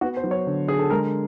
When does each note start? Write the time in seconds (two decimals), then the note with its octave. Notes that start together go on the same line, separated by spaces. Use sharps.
0.01 B3 F#4
0.17 C5
0.24 F#3
0.31 C#5
0.47 D3
0.68 D3 G#4
0.79 A4
0.90 G#3 A#4